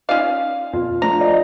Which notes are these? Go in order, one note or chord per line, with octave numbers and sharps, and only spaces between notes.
C#4 D#4 F4 D5 F5
F2 B2 F4
F3 A3 D4 A#5
D5 D#5